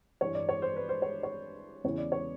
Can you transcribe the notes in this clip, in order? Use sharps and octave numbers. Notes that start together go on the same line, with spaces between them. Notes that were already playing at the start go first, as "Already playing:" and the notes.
G2 E3 C#5
D5
C#5
C5
B4
C5
C#5
C#5
E2 C#3 E3 C#5
D5
C#5